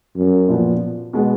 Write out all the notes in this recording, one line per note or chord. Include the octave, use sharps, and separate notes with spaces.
F#2
A#2 F3 B3
B2 G#3 B3